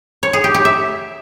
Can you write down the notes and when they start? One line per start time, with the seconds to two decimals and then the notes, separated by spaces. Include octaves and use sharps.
0.23 C#5
0.33 G#4
0.44 G4
0.54 G4
0.65 E5